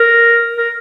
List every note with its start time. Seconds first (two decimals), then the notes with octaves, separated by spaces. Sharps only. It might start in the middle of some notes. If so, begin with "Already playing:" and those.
Already playing: A#4
0.57 A#4